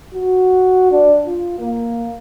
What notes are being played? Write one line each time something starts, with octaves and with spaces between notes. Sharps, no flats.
F#4
D4
F4
A#3